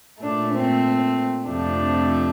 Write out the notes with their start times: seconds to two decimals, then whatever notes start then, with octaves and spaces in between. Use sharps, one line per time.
0.23 A#2 A3 D4
0.54 C4
1.49 F2 C3 F3 A3 D4